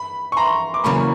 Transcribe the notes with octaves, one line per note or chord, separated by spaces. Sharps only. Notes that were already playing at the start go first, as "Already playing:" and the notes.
Already playing: B5
C#6
A#5 C6
D6
E2 C#3 F#3 A#3 B5 C#6